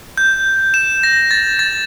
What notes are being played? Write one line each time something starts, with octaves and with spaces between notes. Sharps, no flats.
G6
E7
A#6
A6
A6